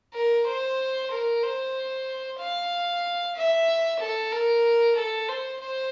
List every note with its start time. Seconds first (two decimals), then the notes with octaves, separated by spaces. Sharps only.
0.14 A#4
0.47 C5
1.11 A#4
1.43 C5
2.39 F5
3.35 E5
4.00 A4
4.32 A#4
4.96 A4
5.28 C5
5.60 C5